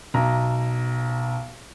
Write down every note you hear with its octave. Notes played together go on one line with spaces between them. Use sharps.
B1 A#5